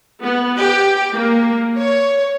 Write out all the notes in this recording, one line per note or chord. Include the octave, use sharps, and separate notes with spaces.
B3
G4
A#3
C#5